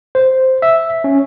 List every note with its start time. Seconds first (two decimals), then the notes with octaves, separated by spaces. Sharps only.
0.15 C5
0.62 E5
1.04 C#4